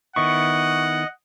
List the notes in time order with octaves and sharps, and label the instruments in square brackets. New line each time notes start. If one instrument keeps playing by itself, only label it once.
[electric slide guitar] D#3 B3 E4 [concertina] D#5 [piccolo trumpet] F#5 [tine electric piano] C#6